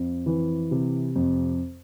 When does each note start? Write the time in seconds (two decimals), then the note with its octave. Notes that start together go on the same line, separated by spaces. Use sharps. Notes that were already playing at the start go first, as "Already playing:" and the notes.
Already playing: F2
0.26 E3
0.71 C3
1.15 F2